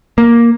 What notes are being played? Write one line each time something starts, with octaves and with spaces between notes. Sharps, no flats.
A#3